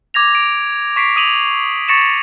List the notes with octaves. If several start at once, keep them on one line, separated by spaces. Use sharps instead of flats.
D6 G#6 A#6 F7
D7
C#6 B6 C7 D7
D#6 D#7 F7 F#7
C#6 A6 A#6 C#7 D7 E7